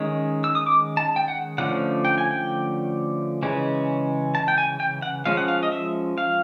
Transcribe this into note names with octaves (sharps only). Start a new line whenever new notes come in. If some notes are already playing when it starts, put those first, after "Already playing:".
Already playing: D#3 G#3 C#4
E6
D#6
D6
A5
G5
F#5
D3 F3 A3 C#4 F#5
G5
G#5
G5
C#3 E3 G#3 C#4
A5
G5
G#5
G5
F#5
F3 G#3 C#4 F5
F#5
F5
D#5
E5
F5